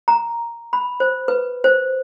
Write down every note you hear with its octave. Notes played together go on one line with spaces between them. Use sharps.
A#5
B5
C5
B4
C5